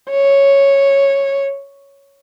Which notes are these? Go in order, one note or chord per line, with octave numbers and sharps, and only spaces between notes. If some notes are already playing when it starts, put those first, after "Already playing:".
C#5